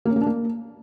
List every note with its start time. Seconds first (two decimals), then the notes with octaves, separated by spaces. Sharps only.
0.05 A#3
0.11 C#4
0.16 A#3
0.21 D4
0.27 A#3